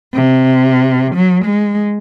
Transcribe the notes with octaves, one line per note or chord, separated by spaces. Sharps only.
C3
F#3
G#3